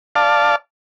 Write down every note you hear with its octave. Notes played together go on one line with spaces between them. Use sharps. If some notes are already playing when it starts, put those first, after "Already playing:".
D5 F5 A5